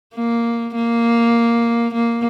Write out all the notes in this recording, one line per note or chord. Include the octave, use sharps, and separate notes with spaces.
A#3
A#3
A#3